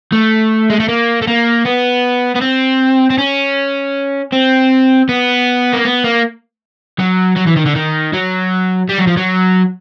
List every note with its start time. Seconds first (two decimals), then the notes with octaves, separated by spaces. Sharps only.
0.12 A3
0.70 G#3
0.80 A3
0.88 A#3
1.22 A3
1.27 A#3
1.66 B3
2.35 B3
2.41 C4
3.10 C4
3.18 C#4
4.33 C4
5.09 B3
5.73 A#3
5.85 B3
6.04 A#3
6.99 F#3
7.37 F#3
7.47 E3
7.57 D#3
7.66 D3
7.76 D#3
8.14 F#3
8.89 G3
8.98 F#3
9.07 F3
9.17 F#3